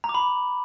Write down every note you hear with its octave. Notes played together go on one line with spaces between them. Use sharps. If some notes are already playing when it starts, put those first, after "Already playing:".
A#5
D6
B5